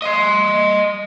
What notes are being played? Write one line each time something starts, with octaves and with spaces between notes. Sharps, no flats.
D#5 C6